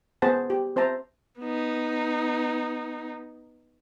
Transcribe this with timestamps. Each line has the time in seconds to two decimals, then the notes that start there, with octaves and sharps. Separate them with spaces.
0.22 B3 G#4 C5 F#5 A5
0.50 G4
0.76 C4 C5 E5 A5 A#5
1.39 B3 D#4